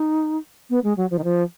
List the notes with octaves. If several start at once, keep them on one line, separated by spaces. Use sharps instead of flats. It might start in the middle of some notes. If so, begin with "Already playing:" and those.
Already playing: D#4
B3
G#3
F#3
F3
D#3
F3